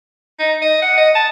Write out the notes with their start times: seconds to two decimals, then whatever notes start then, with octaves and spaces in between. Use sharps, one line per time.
0.39 D#4
0.62 D#5
0.82 F#5
0.98 D#5
1.15 A5